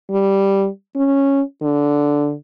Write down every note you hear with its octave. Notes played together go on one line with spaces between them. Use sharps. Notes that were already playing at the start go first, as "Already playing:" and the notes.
G3
C#4
D3